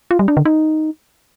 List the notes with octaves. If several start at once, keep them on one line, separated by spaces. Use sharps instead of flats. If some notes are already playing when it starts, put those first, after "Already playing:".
F4
G3
D4
D3
D#4